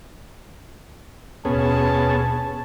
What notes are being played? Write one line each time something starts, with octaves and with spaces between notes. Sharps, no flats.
D#2 B2 B3 C#4 G#4 A5